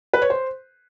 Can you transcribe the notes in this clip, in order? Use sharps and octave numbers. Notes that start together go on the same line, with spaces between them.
B4
C#5
C5